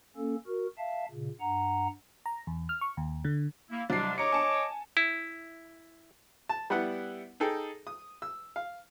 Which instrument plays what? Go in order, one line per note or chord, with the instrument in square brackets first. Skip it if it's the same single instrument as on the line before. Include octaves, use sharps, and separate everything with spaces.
[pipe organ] A#3 C#4 A4
F#4 A#4
E5 F5 A5
A#2 C#3
G2 F#5 A#5
[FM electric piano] A#5
E2
F6
C#6
D#2
D3
[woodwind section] A#3 E4
[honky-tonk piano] C2 C7 [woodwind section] F#3 G#3 D4
[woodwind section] C#5 D#5 D6 [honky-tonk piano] A#5 C#7
[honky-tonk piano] G#5 A5
[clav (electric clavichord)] E4
[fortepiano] A5
G3 B3 E4 F#5
D#4 G#4 A4 G5
D#6
E6
F5